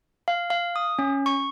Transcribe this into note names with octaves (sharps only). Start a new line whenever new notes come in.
F5
F5
D#6
C#4
C#6